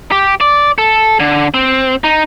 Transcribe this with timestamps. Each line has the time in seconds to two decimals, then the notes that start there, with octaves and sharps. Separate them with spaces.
0.12 G4
0.41 D5
0.78 A4
1.20 D3
1.54 C4
2.04 D#4